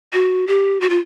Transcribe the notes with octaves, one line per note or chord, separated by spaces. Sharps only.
F#4
G4
F#4
F4